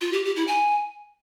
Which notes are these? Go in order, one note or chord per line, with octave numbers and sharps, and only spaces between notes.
F4
G4
G4
E4
G#5